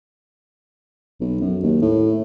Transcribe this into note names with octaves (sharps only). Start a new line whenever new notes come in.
B1
F#2
D#2
A2